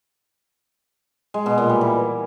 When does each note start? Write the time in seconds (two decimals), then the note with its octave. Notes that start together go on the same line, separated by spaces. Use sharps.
1.34 G#3
1.46 B2
1.58 A#2
1.69 G3
1.81 E3